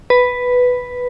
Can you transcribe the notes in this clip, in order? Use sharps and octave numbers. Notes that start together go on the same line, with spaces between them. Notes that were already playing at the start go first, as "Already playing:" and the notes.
B4